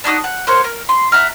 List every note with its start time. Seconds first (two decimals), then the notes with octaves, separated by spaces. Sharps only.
0.04 D4 D#4 F#4 D#6
0.24 F#5
0.47 F#4 A#4 C5 C#5
0.64 A#4
0.89 C6
1.12 E5 F#5 A#5 F6